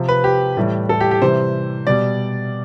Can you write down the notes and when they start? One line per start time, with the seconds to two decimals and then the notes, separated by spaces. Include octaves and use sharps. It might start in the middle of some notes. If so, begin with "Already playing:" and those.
Already playing: C3 F3
0.09 B4
0.24 G4
0.57 A2 E3 G3
0.89 A4
1.01 G4
1.11 G4
1.22 C3 E3 G3 C5
1.87 B2 G3 D5